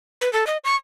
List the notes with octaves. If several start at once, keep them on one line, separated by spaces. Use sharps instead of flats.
B4
A4
D#5
C#6